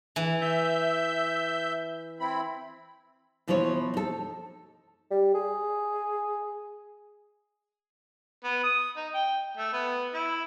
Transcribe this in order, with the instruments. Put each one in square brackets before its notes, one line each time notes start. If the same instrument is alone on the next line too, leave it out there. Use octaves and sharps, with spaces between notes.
[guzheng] E3
[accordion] E5 G6
C4 E4 B5
[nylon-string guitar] B2 E3 F3 E4 C5 C#5
D#4 A4
[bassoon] G3
G#4
[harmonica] B3
D#6
D#4
G5
A3
B3
E4